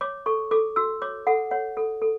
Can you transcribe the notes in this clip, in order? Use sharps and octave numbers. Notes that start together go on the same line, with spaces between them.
C#5 D6
A4 C#6
A4 D6
F#4 E6
C#5 D6
A4 F#5
C#5 F#5
A4
A4